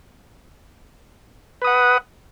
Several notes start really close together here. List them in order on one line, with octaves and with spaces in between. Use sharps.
B4 D#6 F#5